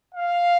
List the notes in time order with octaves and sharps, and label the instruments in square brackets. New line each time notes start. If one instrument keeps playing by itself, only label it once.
[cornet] F5